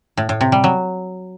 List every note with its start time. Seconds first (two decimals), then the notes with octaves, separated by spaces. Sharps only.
0.17 A2
0.29 A2
0.41 C3
0.52 G3
0.64 F#3